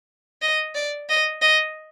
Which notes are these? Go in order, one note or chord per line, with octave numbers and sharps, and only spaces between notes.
D#5
D5
D#5
D#5